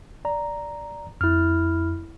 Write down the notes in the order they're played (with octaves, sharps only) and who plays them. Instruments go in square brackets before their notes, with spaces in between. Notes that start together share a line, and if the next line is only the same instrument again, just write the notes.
[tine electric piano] D5 A#5
[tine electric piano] F2 [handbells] E4 F6